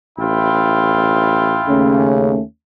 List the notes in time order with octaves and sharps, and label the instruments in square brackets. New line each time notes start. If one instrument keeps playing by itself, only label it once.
[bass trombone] A1 [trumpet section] E4 F4 G5
[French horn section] D#2 A3 C#4 [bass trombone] C#3